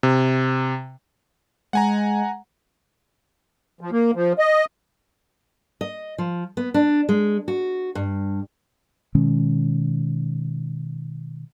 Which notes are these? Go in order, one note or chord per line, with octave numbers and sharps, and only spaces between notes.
C3
G#3 F#5 G#5 A#5
F3
A#3
F3
D#5
D#5
F3
B3
D4
G#3
F#4
G2
B2 D#3 G#3 C#4